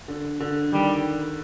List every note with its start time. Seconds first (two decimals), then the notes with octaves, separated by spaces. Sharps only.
0.08 D3
0.40 D3
0.72 D#3 G3